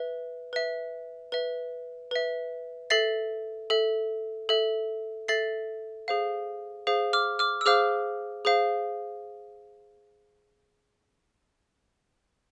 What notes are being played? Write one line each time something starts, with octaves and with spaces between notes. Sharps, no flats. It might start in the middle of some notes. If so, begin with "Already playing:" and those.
Already playing: B4 E5
B4 E5
B4 E5
B4 E5
A4 E5 A6 C7
A4 E5
A4 E5
A4 E5 A6 C7
G#4 C5 F5
G#4 C5 F5
D6 F6
D6 F6
E6
G#4 C5 F5 D6 F6
G#4 C5 F5